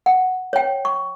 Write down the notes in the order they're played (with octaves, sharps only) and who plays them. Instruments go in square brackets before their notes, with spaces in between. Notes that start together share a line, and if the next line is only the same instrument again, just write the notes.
[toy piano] F#5
C#5 G5
C#6